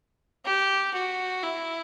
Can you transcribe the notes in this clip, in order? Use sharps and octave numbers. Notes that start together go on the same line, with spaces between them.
G4
F#4
E4